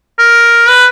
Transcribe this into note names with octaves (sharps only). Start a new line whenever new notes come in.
A#4
B4